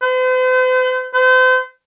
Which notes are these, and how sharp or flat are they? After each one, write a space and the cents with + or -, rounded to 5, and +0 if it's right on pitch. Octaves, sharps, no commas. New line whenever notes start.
C5 -45
C5 -40